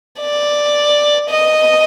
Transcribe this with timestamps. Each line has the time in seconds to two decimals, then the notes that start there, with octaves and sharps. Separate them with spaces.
0.20 D5
1.29 D#5